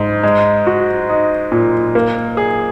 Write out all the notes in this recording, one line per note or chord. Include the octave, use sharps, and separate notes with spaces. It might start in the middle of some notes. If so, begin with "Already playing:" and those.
Already playing: G#2
G#3
F#4
D#4
A#2
A#3
G#4